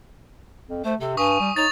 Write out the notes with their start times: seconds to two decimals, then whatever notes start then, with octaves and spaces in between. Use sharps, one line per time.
0.69 F2
0.85 A3 C5
1.00 C3 A4
1.17 G2 G#5 C#6 D#6
1.40 G3
1.56 D#4 C#5 A6 F7